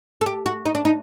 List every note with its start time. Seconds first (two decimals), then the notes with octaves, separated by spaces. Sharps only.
0.21 A4
0.26 G4
0.46 F#4
0.65 D#4
0.75 D4
0.85 D#4